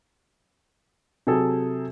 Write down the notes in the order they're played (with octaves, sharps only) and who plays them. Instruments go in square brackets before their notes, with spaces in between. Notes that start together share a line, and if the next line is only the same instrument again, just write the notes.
[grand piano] C3 F#3 G#4 A4